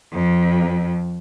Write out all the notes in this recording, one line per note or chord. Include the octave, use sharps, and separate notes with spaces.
F2